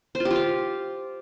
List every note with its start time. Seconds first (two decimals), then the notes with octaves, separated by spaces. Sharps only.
0.15 C5
0.20 F4
0.25 G4
0.30 F4
0.36 F5